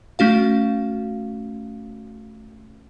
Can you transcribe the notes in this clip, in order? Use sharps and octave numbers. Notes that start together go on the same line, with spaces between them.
A3 C#4 F#4 F5